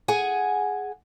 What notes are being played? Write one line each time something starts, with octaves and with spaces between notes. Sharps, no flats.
G#4 F#5 G#5